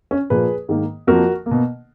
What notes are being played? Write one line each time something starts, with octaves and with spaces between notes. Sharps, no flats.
C#4
A#2 F3 A#3 G#4 B4
G#2 D#3 A#3
F2 F3 A#3 F#4 A#4
A#3
B2